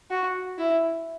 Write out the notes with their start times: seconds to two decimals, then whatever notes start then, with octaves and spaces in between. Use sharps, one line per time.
0.10 F#4
0.58 E4